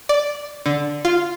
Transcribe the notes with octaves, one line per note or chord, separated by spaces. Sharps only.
D5
D3
F4